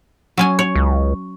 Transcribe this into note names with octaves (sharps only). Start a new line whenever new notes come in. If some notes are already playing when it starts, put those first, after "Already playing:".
F#3 C#4 G#5
C#5
C#2